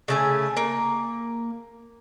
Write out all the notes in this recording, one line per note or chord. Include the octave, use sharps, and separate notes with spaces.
C#3 A3 G#5
A#3